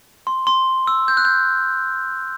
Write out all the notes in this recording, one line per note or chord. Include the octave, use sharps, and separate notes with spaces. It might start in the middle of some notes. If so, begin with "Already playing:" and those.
C6
C6
E6
G6
F#6
G6